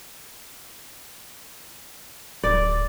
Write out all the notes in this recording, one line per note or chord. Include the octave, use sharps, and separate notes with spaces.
D1 D5